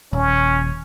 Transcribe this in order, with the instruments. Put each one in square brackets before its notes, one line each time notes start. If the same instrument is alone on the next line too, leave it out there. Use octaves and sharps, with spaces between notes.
[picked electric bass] D#1 [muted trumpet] C#4